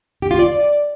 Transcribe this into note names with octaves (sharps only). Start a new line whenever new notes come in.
G4
F4
D5